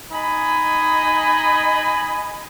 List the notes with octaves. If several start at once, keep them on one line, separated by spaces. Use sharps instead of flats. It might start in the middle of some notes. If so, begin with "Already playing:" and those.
D#4 D#5 G#5 B5